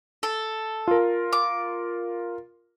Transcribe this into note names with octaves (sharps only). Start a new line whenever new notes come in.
A4
F4 A#4
D6